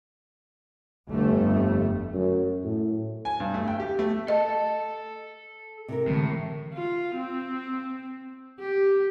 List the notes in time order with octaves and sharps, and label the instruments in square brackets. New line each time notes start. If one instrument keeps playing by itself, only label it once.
[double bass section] G1 F2 A3
[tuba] F#2
A2
[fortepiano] G#5
G2
A3
G5
G4
A3
[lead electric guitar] A4 A5 [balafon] D#5
[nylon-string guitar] C3 A#4
[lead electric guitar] A2 [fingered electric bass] D3 E3 G#3
[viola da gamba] F4
C4
G4